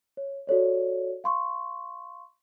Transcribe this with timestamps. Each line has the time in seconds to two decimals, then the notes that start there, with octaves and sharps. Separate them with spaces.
0.17 C#5
0.47 F#4 A4 C#5 D5
1.24 F5 C6 C#6